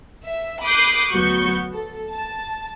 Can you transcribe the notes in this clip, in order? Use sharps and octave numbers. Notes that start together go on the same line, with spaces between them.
E5
B5 D6 D#6 F#6 G6 C7
D2 F#3 B3 F#4 C#6 G6
A4
A5